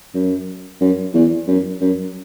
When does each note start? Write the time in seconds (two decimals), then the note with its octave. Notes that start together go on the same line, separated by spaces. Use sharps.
0.14 F#2
0.81 F#2
1.14 E2
1.47 F#2
1.81 F#2